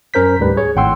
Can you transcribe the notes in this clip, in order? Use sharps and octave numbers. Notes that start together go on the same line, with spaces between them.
F#2 C#4 A#4 C5 G6 B6
D2 G#2 G3 B4
G#4 C#5
G#1 A2 F#5 G5 C6 E6